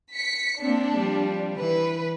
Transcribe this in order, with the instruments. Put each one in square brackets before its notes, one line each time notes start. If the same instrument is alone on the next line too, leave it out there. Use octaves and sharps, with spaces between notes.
[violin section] B6 C#7
[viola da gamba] A#3 C4 [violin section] D4
[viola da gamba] F3 G3
[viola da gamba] E3 [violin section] B4